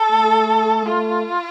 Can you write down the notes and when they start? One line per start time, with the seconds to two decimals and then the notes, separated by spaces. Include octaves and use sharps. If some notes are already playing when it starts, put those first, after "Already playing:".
Already playing: A4
0.11 A3
0.86 A3 F4